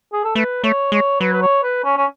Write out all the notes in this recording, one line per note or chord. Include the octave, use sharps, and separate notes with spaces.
G#4
A4
A3 B4
A3 C#5
G#3 C#5
F#3 B4
B4
C#5
B4
C#4
C#4